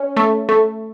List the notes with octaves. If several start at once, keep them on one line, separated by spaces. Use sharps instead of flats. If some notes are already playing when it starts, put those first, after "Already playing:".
Already playing: C#4
A3
A3